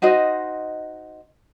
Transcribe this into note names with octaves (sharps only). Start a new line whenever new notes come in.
D#4 F#4 C5 D#5